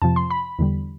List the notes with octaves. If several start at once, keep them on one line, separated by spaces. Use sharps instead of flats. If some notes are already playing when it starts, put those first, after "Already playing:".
F2 C3 F3 A5
C6
B5
E2 D3 G3